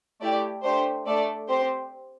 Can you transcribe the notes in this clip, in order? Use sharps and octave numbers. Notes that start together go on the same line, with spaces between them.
A3 E4 G4 D5
A3 D4 G4 C5
A3 D4 A4 D5
C4 G4 C5